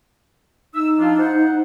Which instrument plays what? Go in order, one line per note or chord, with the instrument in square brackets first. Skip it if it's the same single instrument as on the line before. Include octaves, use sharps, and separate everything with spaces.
[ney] D#4 [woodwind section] E6
[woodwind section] F3 D4 F4
C5 F#5